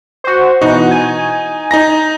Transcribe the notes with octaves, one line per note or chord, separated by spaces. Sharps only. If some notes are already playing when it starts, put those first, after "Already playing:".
F#4 C5
B2 E3 D#4 F#4
G#5
D#4 A#5 A#6